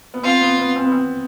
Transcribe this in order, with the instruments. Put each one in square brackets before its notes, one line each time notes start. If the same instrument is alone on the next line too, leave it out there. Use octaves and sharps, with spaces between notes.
[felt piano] B3
[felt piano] C4 [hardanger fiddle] F4
[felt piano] B3
B3
C4
B3
C4